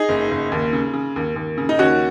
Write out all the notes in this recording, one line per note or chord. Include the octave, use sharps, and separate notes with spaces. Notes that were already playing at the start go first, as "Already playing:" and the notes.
Already playing: D#4 G#4
F#1
F#1
D#2
C#3
C#3
D#2
D#2
C#3
D#4
D#2 C#4 F#4